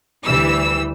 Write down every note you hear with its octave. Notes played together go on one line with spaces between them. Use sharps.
D2 E3 G3 E6